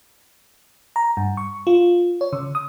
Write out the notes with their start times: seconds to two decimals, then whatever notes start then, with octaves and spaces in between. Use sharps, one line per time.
0.96 A#5
1.17 G2
1.37 C#6
1.67 F4
2.21 C#5
2.33 C#3
2.55 D#6